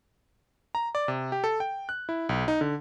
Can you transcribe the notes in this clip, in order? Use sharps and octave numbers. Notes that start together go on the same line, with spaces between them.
A#5
D5
C3
G4
A4
G5
F#6
E4
B1
D#4
D3